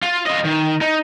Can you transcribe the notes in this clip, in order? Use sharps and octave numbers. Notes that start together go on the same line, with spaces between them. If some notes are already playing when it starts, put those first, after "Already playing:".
F4
F4 D#5
D#3
D#4